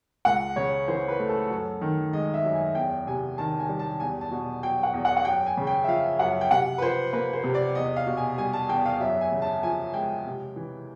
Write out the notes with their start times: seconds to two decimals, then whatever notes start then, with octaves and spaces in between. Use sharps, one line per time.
0.25 C#2 F#5
0.56 C#3 C#5
0.88 E3 C5
1.08 B4
1.19 A3
1.29 A4
1.50 F#2
1.81 D#3
2.13 G#3 D#5
2.34 E5
2.44 F#2
2.55 G#5
2.75 E2 G5
3.06 C3 G#5
3.38 D#3 A5
3.59 G#5
3.69 G3
3.79 A5
4.00 E2 G#5
4.21 A5
4.31 B2
4.63 F#3 G5
4.83 F#5
4.94 E2
5.05 F#5
5.17 F#5
5.25 F#2 G5
5.46 G#5
5.57 C#3
5.67 G5
5.84 E5
5.88 F3 F5
6.19 F#2 F#5
6.41 G5
6.51 C3 F#5
6.78 B4
6.81 F3 C5
7.13 A#3 B4
7.33 C5
7.44 C3
7.54 D5
7.75 E2 D#5
7.96 F5
8.07 B2
8.17 G#5
8.38 G3 G#5
8.53 A5
8.69 E2 G5
8.85 F5
9.00 F#2 E5
9.21 G#5
9.31 C#3
9.42 A5
9.63 F3 G#5
9.94 G#3 G5
10.26 C3
10.56 E3